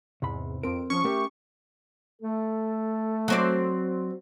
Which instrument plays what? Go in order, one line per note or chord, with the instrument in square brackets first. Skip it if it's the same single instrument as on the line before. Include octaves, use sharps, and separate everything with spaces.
[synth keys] E2 G#2 [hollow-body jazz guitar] C3 B5
[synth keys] F2 D7 [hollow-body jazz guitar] C4 A#4
[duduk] F3 [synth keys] C#4 [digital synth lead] C#6
[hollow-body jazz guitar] A3 A#4 E5 [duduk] G4
[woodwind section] A3 A4
[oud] F#3 C4 D5